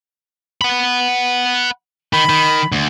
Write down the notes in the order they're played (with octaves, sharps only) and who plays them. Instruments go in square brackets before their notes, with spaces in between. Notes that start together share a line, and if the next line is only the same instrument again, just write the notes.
[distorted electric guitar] F#5 B5
[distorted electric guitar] D#3 [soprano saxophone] B5
[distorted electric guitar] D#3
D2